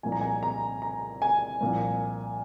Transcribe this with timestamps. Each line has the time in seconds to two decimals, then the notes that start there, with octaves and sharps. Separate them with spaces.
0.03 C2 A#2 F3 G#5
0.12 A#5
0.21 G#5
0.43 A#5
0.82 A#5
1.22 G#5
1.61 C2 A#2 F3